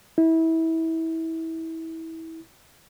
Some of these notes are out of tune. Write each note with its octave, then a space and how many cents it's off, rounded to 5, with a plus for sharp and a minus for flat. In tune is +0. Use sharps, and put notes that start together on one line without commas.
E4 -25